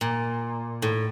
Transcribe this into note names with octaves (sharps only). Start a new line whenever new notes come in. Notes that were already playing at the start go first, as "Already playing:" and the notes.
A#2
A2